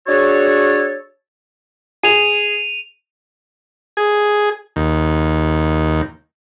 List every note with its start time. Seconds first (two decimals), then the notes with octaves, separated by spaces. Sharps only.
0.07 D4 F#4 G#4 A4 C#5
2.03 G#4 D#7 F7
3.97 G#4
4.76 D#2